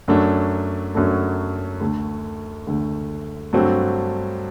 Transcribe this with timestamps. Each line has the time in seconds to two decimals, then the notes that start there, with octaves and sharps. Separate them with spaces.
0.08 F#2 F#3 A3 D4
0.95 F#2 F#3 A3 D4
1.80 D2 D3 A3
2.67 D2 D3 A3
3.53 G2 F#3 A3 C4 F#4